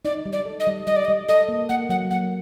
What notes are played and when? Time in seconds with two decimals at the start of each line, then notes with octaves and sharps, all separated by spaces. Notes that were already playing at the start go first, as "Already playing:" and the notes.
0.05 D#4 D5
0.26 G3
0.33 D5
0.45 A4
0.60 D#5
0.67 G3
0.87 G3 D#5
0.96 D5
1.05 D#5
1.08 G3
1.29 A4 D#5
1.49 A#3
1.69 A#3 F#5
1.89 F#3 F#5
2.10 A#3 F#5